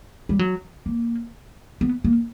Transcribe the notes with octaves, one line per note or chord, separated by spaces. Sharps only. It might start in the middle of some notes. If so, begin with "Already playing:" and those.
G3
F#3
A#3
B3
A#3